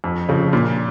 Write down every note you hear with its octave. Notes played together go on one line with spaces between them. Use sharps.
F2
C#3 F3
A#2